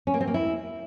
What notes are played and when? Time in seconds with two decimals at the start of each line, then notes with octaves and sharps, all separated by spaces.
0.07 C#4
0.14 A#3
0.21 C4
0.27 A#3
0.34 E4